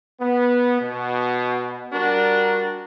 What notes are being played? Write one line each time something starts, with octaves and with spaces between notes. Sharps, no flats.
B3
B2
G3 D4 F#4 A#4